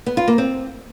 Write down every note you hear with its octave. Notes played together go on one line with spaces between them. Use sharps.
B3
F4
A#3
C4